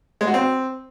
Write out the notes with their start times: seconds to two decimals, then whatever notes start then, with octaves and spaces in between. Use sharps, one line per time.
0.21 G#3
0.27 F#4
0.34 C4